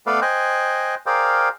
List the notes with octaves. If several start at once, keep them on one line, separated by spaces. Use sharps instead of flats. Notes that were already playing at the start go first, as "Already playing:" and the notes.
A3 B3 A4 B4 D5 F5
C5 D#5 G5 G#5 F#6
G#4 A#4 C5 D5 F5 G5